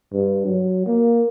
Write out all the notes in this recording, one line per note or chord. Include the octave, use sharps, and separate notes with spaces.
G2
F#3
A#3